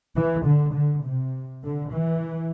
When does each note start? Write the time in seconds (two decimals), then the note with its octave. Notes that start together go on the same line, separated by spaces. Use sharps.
0.16 E3
0.46 D3
0.75 D3
1.05 C3
1.63 D3
1.92 E3